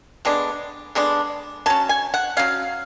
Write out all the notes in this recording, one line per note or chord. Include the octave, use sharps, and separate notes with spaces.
D3 G#3 B3 D4
D3 G#3 B3 D4
F#3 C#4 A5
G#5
F#5
F#3 C#4 F5